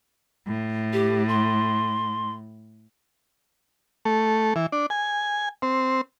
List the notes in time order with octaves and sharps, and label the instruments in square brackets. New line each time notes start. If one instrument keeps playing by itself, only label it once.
[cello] A2
[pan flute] G4
C6
[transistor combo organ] A3
E3
D4
G#5
C4